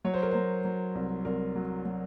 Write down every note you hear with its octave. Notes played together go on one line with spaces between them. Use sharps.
F#3 C#5
C5
A#4
F#3 C5
F#3
C2
C2 A#4
F#3
F#3